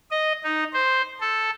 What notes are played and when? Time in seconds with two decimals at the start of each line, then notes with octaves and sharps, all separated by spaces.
0.11 D#5
0.44 D#4
0.73 C5
1.21 A4